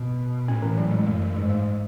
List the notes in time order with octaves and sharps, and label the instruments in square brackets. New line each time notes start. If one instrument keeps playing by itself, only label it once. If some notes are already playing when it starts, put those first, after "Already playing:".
Already playing: [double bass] B2
[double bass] A2 [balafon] C#4
[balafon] E3
F#3
G#3
[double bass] F#2 [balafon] A3
[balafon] A3
[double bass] G#2 [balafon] G#3
[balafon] A3